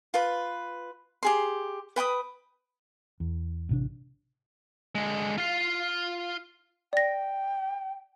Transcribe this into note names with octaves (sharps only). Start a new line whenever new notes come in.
F4 B4 B5
G4 G#4 C6
B4 G5 B5 D#6
E2
A1 C3 D4
D3 G#3
F4 F5
D5 G5 A#6